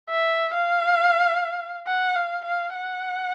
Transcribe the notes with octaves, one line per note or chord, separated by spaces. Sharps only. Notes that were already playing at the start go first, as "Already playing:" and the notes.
E5
F5
F#5
F5
F5
F#5